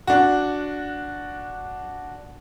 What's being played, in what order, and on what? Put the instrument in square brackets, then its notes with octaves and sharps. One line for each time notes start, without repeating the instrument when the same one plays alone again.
[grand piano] D4 F#4